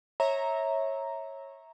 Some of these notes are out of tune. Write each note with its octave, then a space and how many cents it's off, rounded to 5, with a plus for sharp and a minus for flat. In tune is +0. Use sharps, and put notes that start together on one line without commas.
C#5 -15 E5 -20 A#5 +0